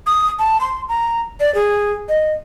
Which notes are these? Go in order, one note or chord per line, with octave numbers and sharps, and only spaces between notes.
D#6
A5
C6
A#5
D5
G#4
D#5